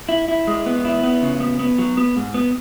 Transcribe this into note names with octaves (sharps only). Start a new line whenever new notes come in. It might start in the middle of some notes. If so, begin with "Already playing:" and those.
E4
E4
G#3
B3
E4
B3
C#3
B3
B3
F#3
B3
G#2
B3